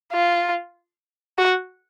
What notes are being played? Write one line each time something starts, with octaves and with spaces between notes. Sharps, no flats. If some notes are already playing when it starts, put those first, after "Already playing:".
F4
F#4